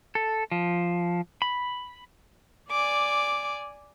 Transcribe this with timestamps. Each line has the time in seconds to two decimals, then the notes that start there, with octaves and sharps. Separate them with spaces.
0.15 A4
0.51 F3
1.42 B5
2.71 D5 G#5 D6